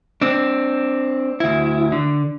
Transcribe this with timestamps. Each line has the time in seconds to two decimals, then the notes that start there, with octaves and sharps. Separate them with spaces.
0.22 C4 D4
1.40 D2 E4
1.92 D3